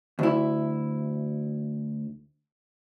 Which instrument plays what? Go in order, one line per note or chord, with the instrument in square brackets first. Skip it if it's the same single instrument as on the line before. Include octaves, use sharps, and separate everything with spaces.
[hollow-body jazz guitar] D2 E4